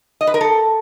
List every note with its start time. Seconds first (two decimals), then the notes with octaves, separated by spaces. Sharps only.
0.21 D#5
0.27 B4
0.34 A#4
0.41 A4